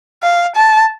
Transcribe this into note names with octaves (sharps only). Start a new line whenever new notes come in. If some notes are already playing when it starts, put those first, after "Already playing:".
F5
A5